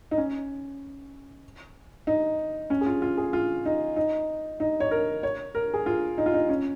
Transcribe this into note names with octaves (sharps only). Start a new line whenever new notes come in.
D#4
C#4
D#4
C#4
G#4
F4
F4
G#4
F4
D#4
D#4
D#4
C#5
A#4
C#5
A#4
G#4
F4
D#4
F4
D#4
C#4